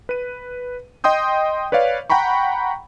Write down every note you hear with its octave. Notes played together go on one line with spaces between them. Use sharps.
B4 D#7
D#5 G5 C6 D#6 G6
B4 C#5 D5 F5
F#5 G5 A#5 B5 C#6